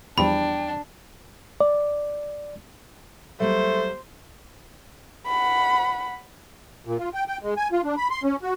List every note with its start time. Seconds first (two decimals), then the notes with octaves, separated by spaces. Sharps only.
0.18 E2 F3 G3 D4 G5 B5
1.61 D5
3.40 F#3 G3 A3 A#3 C5
5.27 F#5 B5
6.87 A#2
6.99 F4
7.14 G5
7.28 G5
7.43 G#3
7.57 G#5
7.72 F4
7.84 D4
7.97 B5
8.11 C6
8.24 C#4
8.42 F#4